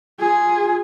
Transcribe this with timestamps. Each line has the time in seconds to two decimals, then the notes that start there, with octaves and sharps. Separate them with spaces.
0.20 F4 G#4